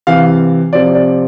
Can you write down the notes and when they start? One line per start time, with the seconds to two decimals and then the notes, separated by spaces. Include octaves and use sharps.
0.07 C3 E3 F5
0.73 C3 F3 D5
0.95 D5